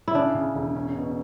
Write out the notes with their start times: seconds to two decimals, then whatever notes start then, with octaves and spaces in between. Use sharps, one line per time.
0.08 E4
0.15 C#3 D4
0.35 C#3
0.55 E1
0.76 C#4
0.96 B2